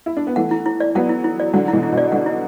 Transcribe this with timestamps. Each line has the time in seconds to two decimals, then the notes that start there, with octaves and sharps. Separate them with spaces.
0.06 E4
0.17 D4
0.27 B3
0.36 E3 A3 F#5
0.51 E4
0.66 E4
0.80 D5
0.95 F#3 B3 F#5
1.09 E4
1.24 E4
1.40 D5
1.53 D3 F#3 F#5
1.68 B2 E3 E4
1.83 E4
1.92 B2
1.98 D5
2.12 D3 F#5
2.26 E4